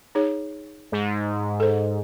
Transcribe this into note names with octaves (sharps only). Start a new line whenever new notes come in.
D#4 G#4 C#5
G#2
A4 C5